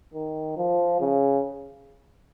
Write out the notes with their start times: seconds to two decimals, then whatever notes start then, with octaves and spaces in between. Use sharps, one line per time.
0.14 D#3
0.57 F3
1.01 C#3